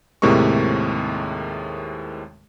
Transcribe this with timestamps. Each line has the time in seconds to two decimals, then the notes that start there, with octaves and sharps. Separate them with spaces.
0.22 D#2 A2 C3 G#3 A#4 C#6